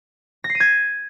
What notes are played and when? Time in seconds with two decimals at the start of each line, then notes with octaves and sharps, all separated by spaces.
0.44 A#6
0.50 C7
0.55 D#7
0.60 G#6